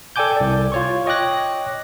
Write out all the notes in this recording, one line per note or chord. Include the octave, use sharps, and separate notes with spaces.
A4 D5 G5 G#5 D6 G6
C2 D5
F4 C#5 C#6
C#5 D#5 G5 D6 F#6 A#6